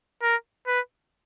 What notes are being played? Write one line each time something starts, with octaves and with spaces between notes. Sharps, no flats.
A#4
B4